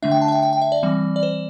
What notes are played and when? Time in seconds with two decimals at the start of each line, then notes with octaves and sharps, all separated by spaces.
0.03 D3 A3 D4 E5
0.11 G5
0.22 A5
0.28 E5
0.32 G5
0.43 G5
0.53 G5
0.62 E5
0.72 D5
0.83 E3 G3 C4
1.16 D5
1.23 C5